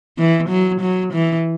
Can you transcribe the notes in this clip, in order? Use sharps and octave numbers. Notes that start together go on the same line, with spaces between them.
E3
F#3
F#3
E3